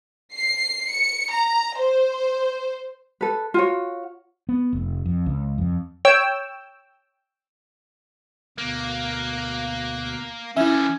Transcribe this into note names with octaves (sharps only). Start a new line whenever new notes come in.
C7
C#7
A#5
C5
A4 B4
F4 F#4 C#5
B3
F1
F2
C#2
F2
C#5 G5 E6
D2 B2 A#3 F#6
D3 E3 C#4 E4 E5